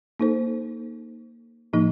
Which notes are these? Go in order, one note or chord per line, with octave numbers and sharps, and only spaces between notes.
A#3 D#4 A4 C5
A2 F3 A#3 D#4